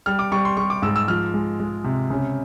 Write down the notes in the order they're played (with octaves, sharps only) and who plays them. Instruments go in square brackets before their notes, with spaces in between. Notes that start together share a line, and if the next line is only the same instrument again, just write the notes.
[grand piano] G3 F6
D6
G3 C#6
C6
G3 C#6
D6
G#2 E6
E6
F3 F6
G#3
G#3
C3
C#3